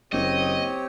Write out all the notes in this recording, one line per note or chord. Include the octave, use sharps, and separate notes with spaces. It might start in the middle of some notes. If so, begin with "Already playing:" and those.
F#1 C4 G4 C#5 D#5